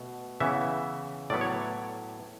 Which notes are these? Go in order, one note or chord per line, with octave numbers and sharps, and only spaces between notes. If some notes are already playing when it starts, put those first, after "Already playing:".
Already playing: B2 A3
C#3 E3 B3 E5
A2 F#3 B3 D5
C#5